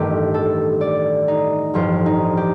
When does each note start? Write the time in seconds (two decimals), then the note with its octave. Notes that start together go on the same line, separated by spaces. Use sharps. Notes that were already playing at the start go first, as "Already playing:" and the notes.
Already playing: A1 G2 D#3 A3 G4
0.34 A4
0.81 D5
1.28 D#4
1.74 A1 G2 F3 F4
2.06 D#4
2.37 G4